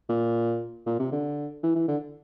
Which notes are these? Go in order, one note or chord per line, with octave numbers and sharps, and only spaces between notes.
A#2
A#2
C3
D3
E3
E3
D3